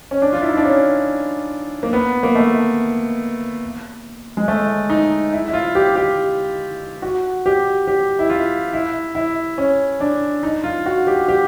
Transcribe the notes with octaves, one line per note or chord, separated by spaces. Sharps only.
C#4
D4
F4
E4
D#4
D4
C#4
A#3
B3
A#3
A3
G#3
A3
D#4
E4
E4
F4
G4
G4
F#4
G4
G4
E4
F4
E4
E4
C#4
D4
D#4
F4
F#4
G4
G4